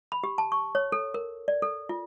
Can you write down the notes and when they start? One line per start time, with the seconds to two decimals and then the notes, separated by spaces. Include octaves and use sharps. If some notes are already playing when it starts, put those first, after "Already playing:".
0.12 B5
0.24 G4
0.38 A5
0.52 C#6
0.75 C#5
0.92 A4
1.14 A#4
1.48 D5
1.62 A4
1.89 F4